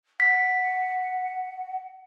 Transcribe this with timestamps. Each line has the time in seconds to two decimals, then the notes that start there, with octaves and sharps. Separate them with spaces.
0.20 F#5 B6